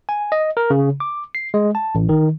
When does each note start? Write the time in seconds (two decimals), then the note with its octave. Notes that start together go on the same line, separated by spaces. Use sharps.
0.09 G#5
0.32 D#5
0.57 A#4
0.70 C#3
1.00 D6
1.35 C7
1.54 G#3
1.75 A5
1.95 A1
2.09 D#3